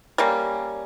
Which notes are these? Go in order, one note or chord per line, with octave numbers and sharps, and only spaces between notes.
G3 A#3 C#4